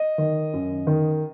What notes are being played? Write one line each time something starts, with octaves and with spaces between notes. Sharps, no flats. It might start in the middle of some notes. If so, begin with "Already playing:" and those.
Already playing: D#5
D#3
F#2
D#3